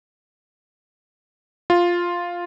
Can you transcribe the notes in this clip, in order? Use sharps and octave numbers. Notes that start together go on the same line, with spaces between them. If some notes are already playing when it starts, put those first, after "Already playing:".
F4